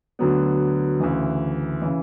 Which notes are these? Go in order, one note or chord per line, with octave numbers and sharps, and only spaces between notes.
D2 D3 F#3 B3
D2 C#3 E3
C#3 E3